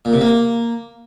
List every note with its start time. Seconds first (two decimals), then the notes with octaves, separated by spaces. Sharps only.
0.05 A#2
0.13 C3
0.21 A#3